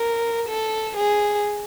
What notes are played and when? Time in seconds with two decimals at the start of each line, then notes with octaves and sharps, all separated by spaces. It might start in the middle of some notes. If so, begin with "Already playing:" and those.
Already playing: A#4
0.49 A4
0.96 G#4